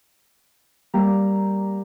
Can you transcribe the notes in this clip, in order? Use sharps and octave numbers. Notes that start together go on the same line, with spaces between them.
G3 A#3 G4 A#5